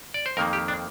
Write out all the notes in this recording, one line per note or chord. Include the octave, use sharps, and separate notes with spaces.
D5
C5
F2 D#3 A#3 A#4
G4
D4